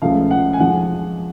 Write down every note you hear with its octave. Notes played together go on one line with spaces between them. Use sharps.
C#2 C#3 F3 A3 F5
F#5
G#5
F2 F3 G#3 F#5